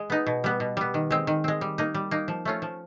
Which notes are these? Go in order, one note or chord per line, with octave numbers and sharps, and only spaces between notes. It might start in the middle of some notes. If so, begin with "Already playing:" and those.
Already playing: G#3
B3 D#4
B2
G3 B3
B2
G3 B3
D#3
G#3 C4
D#3
G#3 C4
G3
A#3 D#4
G3
A#3 D#4
F3
A3 C#4 F4
F3